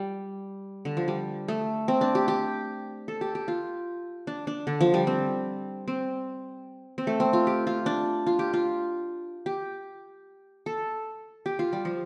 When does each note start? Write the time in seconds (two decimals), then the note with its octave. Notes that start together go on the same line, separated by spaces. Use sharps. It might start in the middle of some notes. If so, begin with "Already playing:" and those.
Already playing: G3
0.85 D3
0.97 F3
1.08 G3
1.48 A3
1.88 C4
2.01 D4
2.15 G4
2.28 G4
3.08 A4
3.21 G4
3.35 G4
3.48 F4
4.27 D4
4.47 D4
4.67 D3
4.81 F3
4.94 G3
5.07 C4
5.88 C4
6.98 C4
7.07 A3
7.20 C4
7.33 F4
7.47 G4
7.67 F4
7.86 D4
8.26 F4
8.39 G4
8.53 F4
9.46 G4
10.66 A4
11.46 G4
11.59 F4
11.73 G3
11.85 F3